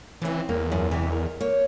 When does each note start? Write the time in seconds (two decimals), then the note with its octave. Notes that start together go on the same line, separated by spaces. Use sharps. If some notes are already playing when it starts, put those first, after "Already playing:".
0.22 C#3 E3 C4
0.49 E2 A#3
0.72 F#2 F3
0.91 F2 C3 E3
1.12 A#4
1.41 A#3 C#5